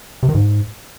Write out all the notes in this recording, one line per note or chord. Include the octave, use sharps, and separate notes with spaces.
C3
D#3
G#2